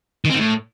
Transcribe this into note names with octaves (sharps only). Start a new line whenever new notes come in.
D#3
C4
D#3
A2